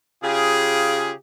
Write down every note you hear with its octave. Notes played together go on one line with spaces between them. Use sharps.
C#3 F4 G4 G#4